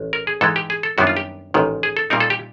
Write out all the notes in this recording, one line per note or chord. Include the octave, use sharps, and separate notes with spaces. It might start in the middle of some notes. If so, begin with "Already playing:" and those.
Already playing: A1
A#4
G#4
G#2 E3 G#3 A4
G4
G#4
A4
F#2 D#3 G3 B3 D4 F#4
F4
G4
A1 G#2 D#3
G#4
A4
A#2 G3 C4 D#4 A#4
A4
G4